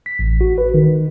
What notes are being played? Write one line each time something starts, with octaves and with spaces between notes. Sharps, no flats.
B6
A1
F#4
B4
D#3